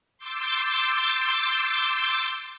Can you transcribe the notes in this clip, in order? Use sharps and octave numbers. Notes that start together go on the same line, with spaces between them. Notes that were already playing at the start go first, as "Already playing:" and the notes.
C6 D6 E6 G6 A6